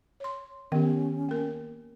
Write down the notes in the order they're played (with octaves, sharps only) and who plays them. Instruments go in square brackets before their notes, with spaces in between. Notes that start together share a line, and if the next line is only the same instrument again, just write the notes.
[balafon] C#5 C6
[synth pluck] D#3 [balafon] B3 G4 [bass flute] C#4
[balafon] A#3 A#4